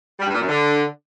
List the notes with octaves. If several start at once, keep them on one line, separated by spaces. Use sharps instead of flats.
G3
G2
A#2
F#2
D3